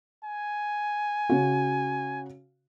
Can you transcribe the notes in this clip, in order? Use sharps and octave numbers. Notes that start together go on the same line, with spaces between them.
G#5
C#3 F#4